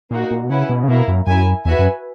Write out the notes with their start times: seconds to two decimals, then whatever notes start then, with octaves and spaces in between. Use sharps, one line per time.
0.11 A#2 A#3 D#4 F#4
0.31 A#2
0.44 B2
0.50 C#3 C#4 E4 B4 F#5
0.69 B2
0.83 C#3
0.88 B2 A#3 E4 A#4
1.08 F#2
1.27 F#2 E4 A#4 E5 G#5
1.65 E2 F#4 B4 E5 G#5
1.79 F#2